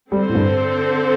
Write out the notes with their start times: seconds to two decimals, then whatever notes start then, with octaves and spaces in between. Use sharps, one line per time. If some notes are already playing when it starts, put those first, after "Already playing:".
0.11 D3 G3 C4 A4 C5
0.29 A2
0.35 G2